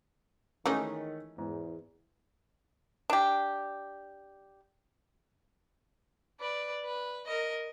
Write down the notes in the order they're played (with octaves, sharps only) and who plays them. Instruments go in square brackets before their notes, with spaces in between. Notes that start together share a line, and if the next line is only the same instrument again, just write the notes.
[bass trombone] D#3 [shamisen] E3 G#3 D#4 [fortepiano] A3 C#4
[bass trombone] E2 [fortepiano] G#2
[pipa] D4 G4
[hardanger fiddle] B4 D5
B4
A#4 D#5